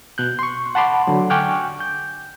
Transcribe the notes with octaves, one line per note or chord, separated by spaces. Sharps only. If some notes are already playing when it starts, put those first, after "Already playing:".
B2 F#6 G6
C6 C#6
F#5 A5 B5 C6 D6
D3 F#3
G5 G#5 C#6 D6 F6 F#6
G6